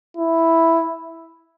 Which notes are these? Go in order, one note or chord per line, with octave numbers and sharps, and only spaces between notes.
E4